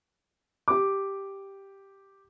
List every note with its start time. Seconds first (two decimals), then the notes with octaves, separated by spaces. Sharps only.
0.68 G4 D6